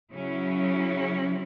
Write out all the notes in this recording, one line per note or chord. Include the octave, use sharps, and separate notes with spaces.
C#3 F#3 C#4 E4